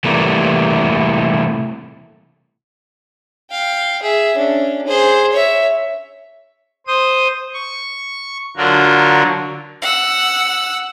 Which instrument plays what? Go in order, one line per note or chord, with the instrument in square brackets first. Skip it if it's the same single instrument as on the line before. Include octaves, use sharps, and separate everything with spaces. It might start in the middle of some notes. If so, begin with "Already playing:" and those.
[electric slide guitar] C3 E3 G3 A3 A#3
[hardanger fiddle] F5 G5
G#4 E5
C#4 D4
G#4 C5
C#5 E5
[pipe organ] C5 D#6
C#6
D3 F#3 F4 F#4 A#4
[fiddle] F#5 E6